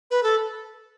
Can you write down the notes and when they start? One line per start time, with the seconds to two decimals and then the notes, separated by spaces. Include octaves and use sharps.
0.11 B4
0.23 A4